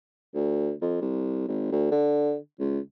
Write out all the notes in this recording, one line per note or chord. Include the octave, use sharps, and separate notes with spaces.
D2
F2
C2
G#1
D2
D3
C#2